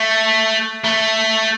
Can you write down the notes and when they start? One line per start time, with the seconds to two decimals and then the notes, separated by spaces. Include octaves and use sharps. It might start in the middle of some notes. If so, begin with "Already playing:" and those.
Already playing: A3
0.84 A3